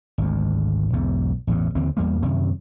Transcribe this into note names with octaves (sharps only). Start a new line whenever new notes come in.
G#1 D2
B1 E2 G#2
A1 E2 G2
D#2 D3 E3 C4
E2 G3 A#3
F#2 C3 D#3